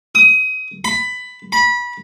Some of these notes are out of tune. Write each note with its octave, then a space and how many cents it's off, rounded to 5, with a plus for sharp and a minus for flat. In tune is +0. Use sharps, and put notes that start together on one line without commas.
D#6 +25
B5 +15
B5 -25